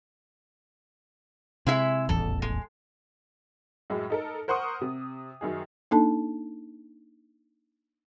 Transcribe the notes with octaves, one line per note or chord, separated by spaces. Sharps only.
C3 G#3 E4 E5
D#1 A1 E2 A4
G#3
F#2 A2 G#3
D#4 A4 A#4
A#4 C5 F#5 C6 C#6 D#6
C3
F#2 D#3 G#4
A#3 D4 D#4 A4 A5